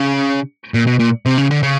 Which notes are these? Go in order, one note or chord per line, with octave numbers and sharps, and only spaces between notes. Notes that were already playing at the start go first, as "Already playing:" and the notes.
Already playing: C#3
A#2
B2
A#2
C3
C#3
D3
C#3